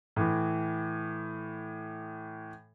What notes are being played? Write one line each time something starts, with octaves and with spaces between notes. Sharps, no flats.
A2 E3